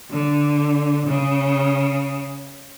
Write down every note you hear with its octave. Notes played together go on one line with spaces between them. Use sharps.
D3
C#3